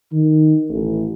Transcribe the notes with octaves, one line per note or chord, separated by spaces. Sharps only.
D#3
A1